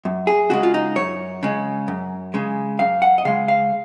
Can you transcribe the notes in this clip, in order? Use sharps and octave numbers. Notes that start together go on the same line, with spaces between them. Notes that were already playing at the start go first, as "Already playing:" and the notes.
F#2
G#4
C#3 G#3 F#4
F4
D#4
F#2 C#5
C#3 G#3
F#2
C#3 G#3
F#2 F5
F#5
D#5
C#3 G#3 F5
F5